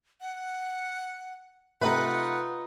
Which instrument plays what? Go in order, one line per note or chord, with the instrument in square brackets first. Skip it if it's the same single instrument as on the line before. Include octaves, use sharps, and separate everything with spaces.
[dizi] F#5
[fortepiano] C3 A3 A#5 [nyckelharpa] D#4 F4 [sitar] B4 [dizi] F#5